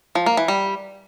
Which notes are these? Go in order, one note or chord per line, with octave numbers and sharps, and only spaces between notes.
F3
A#3
E3
G3